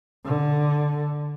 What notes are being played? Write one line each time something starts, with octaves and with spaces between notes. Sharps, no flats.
D3